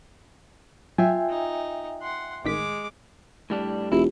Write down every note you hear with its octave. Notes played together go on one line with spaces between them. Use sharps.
F#3 F4 E5 G5 G#5
D#4
F#5 C6
A1 D#3 G#3 D6 B6
A2 G3 D4
E1 E4 F4 G4